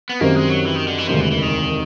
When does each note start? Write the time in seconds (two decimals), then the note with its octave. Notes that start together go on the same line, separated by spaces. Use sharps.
0.09 B3
0.20 F#2 D#3 G3 A#3 C4
0.35 G#3
0.49 F#3
0.65 E3
0.76 D#3
0.88 D3
0.98 E3
1.09 E1 D2 C3 D#3 F3
1.21 E3
1.31 E3
1.42 D#3